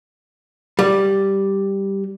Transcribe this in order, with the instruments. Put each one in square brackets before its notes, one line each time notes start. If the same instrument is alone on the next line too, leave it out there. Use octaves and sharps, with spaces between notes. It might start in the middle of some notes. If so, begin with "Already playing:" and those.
[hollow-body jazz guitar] G3